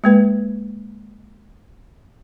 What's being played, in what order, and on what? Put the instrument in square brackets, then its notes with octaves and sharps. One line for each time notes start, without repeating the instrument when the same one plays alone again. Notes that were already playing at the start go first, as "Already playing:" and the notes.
[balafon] G#3 A#3 B4